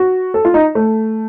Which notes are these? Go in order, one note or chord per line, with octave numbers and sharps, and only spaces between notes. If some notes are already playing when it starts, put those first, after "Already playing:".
Already playing: F#4
A4
F4
D#4
A3